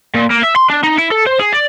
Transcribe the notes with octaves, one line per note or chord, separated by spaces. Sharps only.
A#2
A#3
E5
C6
D4
D#4
E4
A4
C5
G#4
D5